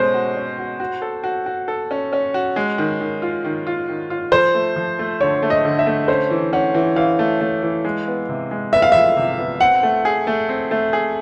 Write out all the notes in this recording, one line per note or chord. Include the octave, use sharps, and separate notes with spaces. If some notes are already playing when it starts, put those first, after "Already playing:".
Already playing: B2 G#3 C#4 C5
F#4
C#4
F#4
F#4
A4
F#4
F#4
A4
C#4
C#4
F#4
G#3
D#3
D#3
F4
D#3
F4
D#3
F4
F3 C5
A3
F3
A3
D3 C#5
A3
D#5
D3
E5
A3
C#4 C5
E3
C#4 F#5
E3
E3 F5
A3
A3
E3
G#3
B3
C3
G#3
B3 E5
F5
F3 E5
C3
B3
C4 F#5
A3
G#4
A3
C4
A3
G#4